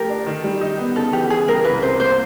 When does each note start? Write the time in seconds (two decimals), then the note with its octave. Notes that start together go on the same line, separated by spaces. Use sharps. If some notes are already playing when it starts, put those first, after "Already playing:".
Already playing: F3 A3 G4 A#4
0.09 D4
0.26 D#3
0.44 G3
0.61 D#4
0.78 B3
0.96 C#3 A4
1.13 E3 G4
1.30 C#3 G#4
1.48 G3 A#4
1.64 C2 B4
1.82 C3 C5
1.99 A#3 C5